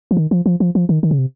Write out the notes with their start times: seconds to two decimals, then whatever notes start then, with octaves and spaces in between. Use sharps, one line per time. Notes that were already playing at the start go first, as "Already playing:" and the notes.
0.11 F3
0.17 D#3
0.31 F3
0.46 F3
0.60 F3
0.75 F3
0.89 D#3
1.03 D#3
1.11 C#3
1.18 C3